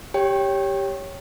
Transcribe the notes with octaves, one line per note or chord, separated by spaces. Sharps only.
G4 C#5 G5